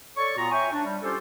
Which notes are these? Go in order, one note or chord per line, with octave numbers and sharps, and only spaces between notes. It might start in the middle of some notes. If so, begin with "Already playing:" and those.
A4 C#5 D5 C#6
A#2 B3 F4 F#4 A#5
C#5 E5 G5 G#5 C#6
D4
G3
C#4 F4 G4 A4 C5